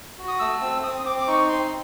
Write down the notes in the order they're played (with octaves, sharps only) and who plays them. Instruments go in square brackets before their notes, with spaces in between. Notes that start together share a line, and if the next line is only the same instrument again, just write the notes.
[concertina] F#4
D#6
A3 E6
C4 E6
C4 D#6
C4 D6
D6
D#4 C#6
C4 C6